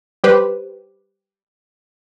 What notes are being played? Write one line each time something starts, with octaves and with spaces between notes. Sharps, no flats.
G3 G4 B4 C5